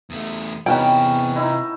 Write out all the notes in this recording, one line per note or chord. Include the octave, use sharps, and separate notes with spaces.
E2 A3
E2 C3 B3 C#4 D#4 B4 G5
D#4 E4